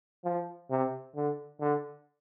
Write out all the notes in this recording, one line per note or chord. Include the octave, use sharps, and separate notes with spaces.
F3
C3
D3
D3